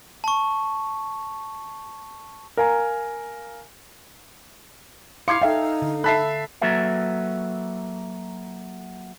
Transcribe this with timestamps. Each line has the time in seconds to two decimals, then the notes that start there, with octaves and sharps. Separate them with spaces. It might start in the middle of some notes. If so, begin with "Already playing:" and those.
0.24 A5 C#6
2.57 A#4 F5 G#5 A#5
5.28 E4 F5 C6 D6 G#6 C7 C#7
5.41 D#4 A4 E5 F5 G5
5.82 D3
6.04 A4 E5 A5 B5 F#6 B6 C7
6.61 F#3 A#3 F#4 A4 B4 E5